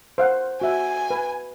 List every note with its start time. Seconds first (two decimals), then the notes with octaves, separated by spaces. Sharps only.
0.18 C5 F5 F#5
0.61 F#4 E5 G#5
1.10 B4